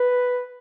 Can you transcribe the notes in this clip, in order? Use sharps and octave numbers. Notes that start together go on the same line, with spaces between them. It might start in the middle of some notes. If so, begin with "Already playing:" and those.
Already playing: B4